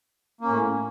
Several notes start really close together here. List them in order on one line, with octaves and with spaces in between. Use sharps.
A#3 C#4 A2